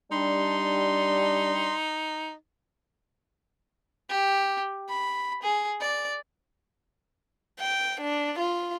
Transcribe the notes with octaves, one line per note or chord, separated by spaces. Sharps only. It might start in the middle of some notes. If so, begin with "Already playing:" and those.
G3 D4 D#4 C6
G4
B5
G#4
D5
G5
D4
F4